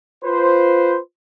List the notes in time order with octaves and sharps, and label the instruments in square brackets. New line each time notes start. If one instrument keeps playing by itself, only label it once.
[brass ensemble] F4 B4 C5